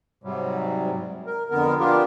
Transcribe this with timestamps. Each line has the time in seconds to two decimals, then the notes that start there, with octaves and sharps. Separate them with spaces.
0.24 G#2 C3 F#3 G3
1.27 A#4
1.51 F2 D3 B3 A#4
1.80 A#3 B3 D4 F4 G4 A#4